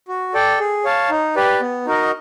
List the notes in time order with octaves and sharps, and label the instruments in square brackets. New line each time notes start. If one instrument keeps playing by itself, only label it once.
[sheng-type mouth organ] F#4
A4 D5 G5
G#4
C#5 F5 A5
D#4
G4 B4 D5
B3
D#4 F#4 A#4 D#5